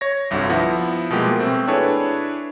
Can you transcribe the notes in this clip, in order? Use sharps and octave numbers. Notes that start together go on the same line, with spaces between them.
C#5 A#6
G1 C2 G2 D3 F#4
F3 B3 E4 F#5
B2 F3 G3 G#3 A#3 G4
B2 A3 C4
D4 E4 G#4 A4 B4 C#5